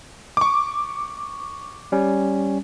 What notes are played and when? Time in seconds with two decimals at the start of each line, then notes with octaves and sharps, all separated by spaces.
0.37 C#6 D6
1.92 G3 C#4